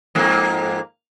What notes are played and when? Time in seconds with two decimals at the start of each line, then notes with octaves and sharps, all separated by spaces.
0.15 F2 G#2 A#3